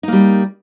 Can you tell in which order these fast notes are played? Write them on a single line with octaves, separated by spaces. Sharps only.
D#4 A#3 G3